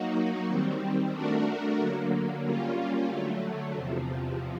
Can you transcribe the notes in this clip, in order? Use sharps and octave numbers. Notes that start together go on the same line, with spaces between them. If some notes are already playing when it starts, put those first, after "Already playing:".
Already playing: F#3 A#3 D#4 F#4
D#3 G3 C4
A3 D4 F#4 A#4
D3 F#3 A#3
G3 A#3 C#4 F4
D3 F#3 A3
E2 C3 F3